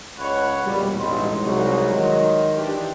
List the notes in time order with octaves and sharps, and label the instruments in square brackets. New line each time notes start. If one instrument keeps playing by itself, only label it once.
[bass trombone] C#2 [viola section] C#5 F#5 [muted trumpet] B5
[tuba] E1 [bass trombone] A#2 [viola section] G3
[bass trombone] A1 [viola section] G#3 D#4 [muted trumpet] C6
[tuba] C2 [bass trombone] F#3 [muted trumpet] F#4
[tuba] D#3 [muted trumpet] C6
[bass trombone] E3 [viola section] D4 G4